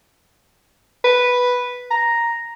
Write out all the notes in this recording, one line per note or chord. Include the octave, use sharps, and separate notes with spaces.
B4
A#5